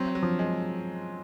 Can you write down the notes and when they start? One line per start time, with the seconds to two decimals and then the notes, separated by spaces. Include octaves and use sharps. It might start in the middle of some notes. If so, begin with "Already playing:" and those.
Already playing: F#3 C4
0.15 F#3
0.22 F3
0.39 G#3